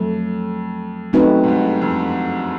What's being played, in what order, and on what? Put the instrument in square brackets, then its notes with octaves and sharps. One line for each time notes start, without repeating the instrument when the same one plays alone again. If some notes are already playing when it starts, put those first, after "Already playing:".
Already playing: [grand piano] F2 [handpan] F#3 A3
[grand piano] F#2 [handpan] A3 C4 D#4 F#4 B4
[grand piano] G#2
G2
F2